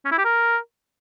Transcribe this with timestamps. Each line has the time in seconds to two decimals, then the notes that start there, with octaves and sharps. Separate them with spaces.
0.05 C#4
0.12 E4
0.18 G4
0.24 A#4